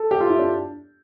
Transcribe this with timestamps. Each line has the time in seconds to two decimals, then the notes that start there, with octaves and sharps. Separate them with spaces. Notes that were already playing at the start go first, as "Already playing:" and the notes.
Already playing: A4
0.11 G4
0.20 F4
0.29 E4
0.39 D4